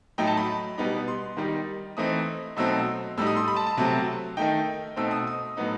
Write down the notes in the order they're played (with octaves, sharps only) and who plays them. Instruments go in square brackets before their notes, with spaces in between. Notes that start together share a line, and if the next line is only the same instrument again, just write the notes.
[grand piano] A2 F#3 A3 D#4 G5
A5
B5
B2 G3 B3 D#4
C6
D#3 G3 D#4
E3 A3 C4 D#4 D#6
B2 F#3 A3 C4 D#4 E6
A2 G3 D#4 E6
D#6
C6
B5
A5
A5
C3 F#3 A3 C4
D#3 A3 D#4 G5
B2 A3 C4 D#4 E6
D#6
D#6
A2 F#3 B3 D#4